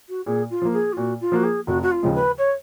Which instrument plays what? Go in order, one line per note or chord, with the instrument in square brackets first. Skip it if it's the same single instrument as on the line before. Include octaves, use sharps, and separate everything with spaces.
[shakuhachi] F#4
[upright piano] A#2 [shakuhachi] G#4
[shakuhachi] F4
[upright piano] F3 A#3
[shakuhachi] G#4
F4
[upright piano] A#2 [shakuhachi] F#4
[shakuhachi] F4
[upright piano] F3 A#3 [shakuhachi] F#4
[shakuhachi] G#4
[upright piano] F1 [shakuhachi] F#4
[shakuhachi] F#4
F4
[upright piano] D#2 C#3 F3 G#3
[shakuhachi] B4
C#5